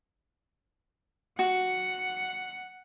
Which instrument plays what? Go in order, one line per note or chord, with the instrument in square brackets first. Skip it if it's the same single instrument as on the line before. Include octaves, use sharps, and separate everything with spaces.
[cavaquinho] F#4 [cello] F#5